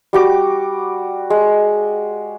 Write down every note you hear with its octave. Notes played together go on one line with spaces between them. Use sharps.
G3 F#4 D6
G#3